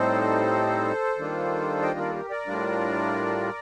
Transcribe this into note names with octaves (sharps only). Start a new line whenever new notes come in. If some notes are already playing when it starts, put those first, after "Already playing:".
Already playing: A2 G3 C4 D#4 A4 C5
D#3 G3 A#3 D4 F4
D#5 G5
A#4 D5
A4
G4 A#4
A#4 D5
A2 G3 D4 F4